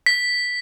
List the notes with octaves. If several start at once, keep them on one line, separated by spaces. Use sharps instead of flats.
B6